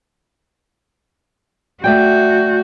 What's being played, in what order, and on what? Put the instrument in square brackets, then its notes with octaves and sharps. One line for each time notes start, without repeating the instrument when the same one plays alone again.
[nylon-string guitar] A3 D5 G5 [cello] F#4 [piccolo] G6